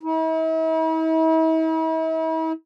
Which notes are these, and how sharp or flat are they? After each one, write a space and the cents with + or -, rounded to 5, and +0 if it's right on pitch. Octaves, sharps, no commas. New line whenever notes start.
E4 -45